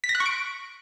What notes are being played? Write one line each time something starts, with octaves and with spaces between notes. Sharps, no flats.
B6
A#6
F#6
C#6
D7